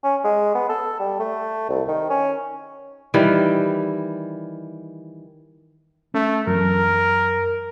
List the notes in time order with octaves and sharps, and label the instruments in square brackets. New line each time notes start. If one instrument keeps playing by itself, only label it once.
[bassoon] C#4
G#3
B3
A4
G3
A3
C2
D#3
C#4
[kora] D#3 E3 G3
[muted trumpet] A3 [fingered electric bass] C#4
[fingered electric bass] F#2 E3 F#3 [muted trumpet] A#4